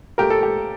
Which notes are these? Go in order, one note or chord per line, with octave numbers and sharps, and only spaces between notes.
A#2 A3 G4 A#4
A4
G4